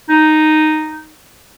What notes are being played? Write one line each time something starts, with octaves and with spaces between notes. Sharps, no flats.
D#4